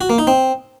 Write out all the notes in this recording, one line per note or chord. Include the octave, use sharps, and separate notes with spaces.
F#4
A#3
D#4
C4